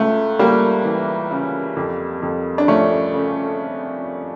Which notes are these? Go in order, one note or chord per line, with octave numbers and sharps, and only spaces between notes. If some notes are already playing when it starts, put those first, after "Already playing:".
Already playing: C#2 A3
C#2 G3 A#3
E3
C#3
F2
F2
D4
F3 A3 C#4
C#3